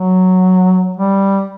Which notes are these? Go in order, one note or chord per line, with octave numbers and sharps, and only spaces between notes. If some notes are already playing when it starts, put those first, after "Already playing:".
Already playing: F#3
G3